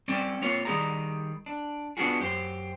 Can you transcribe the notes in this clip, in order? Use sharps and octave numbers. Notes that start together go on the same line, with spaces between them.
G3 C4 C#4 D5
A#3 C4 F4 C#5
D#3 G3 B3 G#4 D5 A#5
D4
B3 C#4 D4 F4 F#4 G#4
F#2 G4 C5